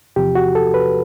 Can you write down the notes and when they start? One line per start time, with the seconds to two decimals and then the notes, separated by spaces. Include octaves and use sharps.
0.16 E2 C3 F3 G4
0.35 F#4
0.55 A4
0.74 B4